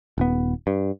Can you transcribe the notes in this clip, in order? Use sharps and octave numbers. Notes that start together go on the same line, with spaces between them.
D#1 B3
G2